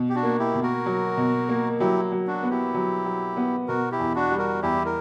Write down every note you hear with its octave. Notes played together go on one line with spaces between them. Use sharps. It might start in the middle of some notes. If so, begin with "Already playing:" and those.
Already playing: B2
G4
D4 F#4
A#3
E4 G4
B2
F#4 A#4
F#3
B2
A#3
F#3 E4 G4
F#3
D4 F#4
B3
E4 G4
F#3
F#3
B3
B2 F#4 A#4
E4 G4
E2
D4 F#4
G3
F#4 A#4
E2 E4 G4
A#4